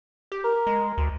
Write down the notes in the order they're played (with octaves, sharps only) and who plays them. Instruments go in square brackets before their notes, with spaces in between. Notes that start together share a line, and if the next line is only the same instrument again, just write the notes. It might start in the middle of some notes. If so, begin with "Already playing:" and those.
[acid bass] G4
[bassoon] A#4
[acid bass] G#3
D2